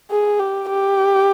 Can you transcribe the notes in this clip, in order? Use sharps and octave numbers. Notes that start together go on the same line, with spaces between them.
G#4
G4
G4